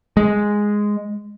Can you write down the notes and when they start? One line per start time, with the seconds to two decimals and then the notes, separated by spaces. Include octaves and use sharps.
0.17 G#3